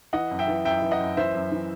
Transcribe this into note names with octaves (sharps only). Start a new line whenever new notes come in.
E3 D#5 F#5
F#2
E5 G5
E3
F#2 E5 G5
E3
D#5 F#5
F#2
E3 C5 E5
F#2
E3